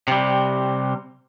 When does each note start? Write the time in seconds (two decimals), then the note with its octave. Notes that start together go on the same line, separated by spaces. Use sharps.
0.08 C3 G3